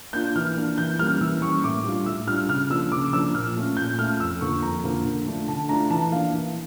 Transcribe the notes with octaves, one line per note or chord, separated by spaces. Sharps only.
A#3 D4 F4 G6
E3 F6
A#3 D4 F4
E3 G6
G3 A#3 C#4 F6
E3 E6
G3 A#3 C#4 C#6
A2 D6
G3 D4 F4
A2 E6
G3 D4 F4 F6
C#3 F6
F3 A#3 D4 E6
C#3 D6
F3 A#3 D4 E6
A#2 F6
A3 C#4 F4
A#2 G6
A3 C#4 F4 F6
F2 E6
D3 F3 A#3 C#6
F2 A#5
D3 F3 A#3
D3
A3 D4 F4
D3 A5
A3 D4 F4 A#5
E3 A5
A#3 D4 F5
E3